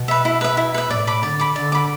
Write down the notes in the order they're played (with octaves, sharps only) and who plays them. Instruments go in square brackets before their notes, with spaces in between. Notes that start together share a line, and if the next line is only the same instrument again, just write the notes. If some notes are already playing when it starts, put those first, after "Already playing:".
Already playing: [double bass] B2
[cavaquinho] B4 E5
E4
B4 E5
E4
B4 E5
[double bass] A2 [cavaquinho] D5
[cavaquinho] B5 D6
[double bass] D3 [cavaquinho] D5
[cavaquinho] B5 D6
[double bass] D3 [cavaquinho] D5
[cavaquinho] B5 D6